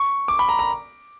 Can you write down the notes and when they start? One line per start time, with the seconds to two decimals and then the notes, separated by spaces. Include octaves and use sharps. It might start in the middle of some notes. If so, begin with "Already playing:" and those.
Already playing: C#6
0.28 D6
0.39 B5
0.49 A#5
0.59 A#5